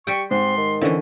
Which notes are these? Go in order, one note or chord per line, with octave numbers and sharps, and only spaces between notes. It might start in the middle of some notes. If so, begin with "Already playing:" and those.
G3 G4 G5 C#6
G#2 C4 C6
D#3
D3 E3 C4 C#4 E4